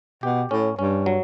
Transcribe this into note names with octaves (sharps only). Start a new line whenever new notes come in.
B2 G4
A2 C#4
G2 C#4
F#3